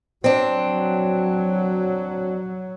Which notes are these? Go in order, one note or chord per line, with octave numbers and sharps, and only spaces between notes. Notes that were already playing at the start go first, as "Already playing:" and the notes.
F#3 C4 D4